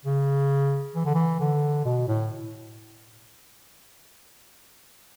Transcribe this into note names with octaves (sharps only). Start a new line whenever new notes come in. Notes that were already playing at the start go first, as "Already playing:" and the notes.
C#3
E3
D3
E3
D3
B2
A2